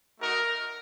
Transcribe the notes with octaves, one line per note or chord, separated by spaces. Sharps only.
A3 D#4 F#4 A#4